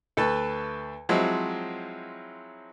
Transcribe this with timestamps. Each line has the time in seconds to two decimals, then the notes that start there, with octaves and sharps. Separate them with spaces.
0.17 D2 A4 B4 A5
1.09 F3 F#3 G#3 C4 E4